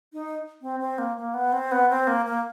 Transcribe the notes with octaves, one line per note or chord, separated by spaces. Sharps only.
D#4
C4
C4
A#3
A#3
B3
C4
B3
C4
A#3
A#3